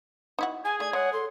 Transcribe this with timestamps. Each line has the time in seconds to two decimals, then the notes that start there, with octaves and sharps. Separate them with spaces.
0.39 D#4 E4 F#4
0.65 G#4 G#5
0.80 A3 D5 G#6
0.93 G#3 C#5 F#5
1.13 A4 C6